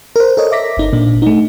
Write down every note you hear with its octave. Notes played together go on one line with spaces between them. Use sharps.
A#4 C5
A4 A#4 C#5 D#5
E5 D6 A#6 B6
G1 D#4
A#2 D4
A3 D#4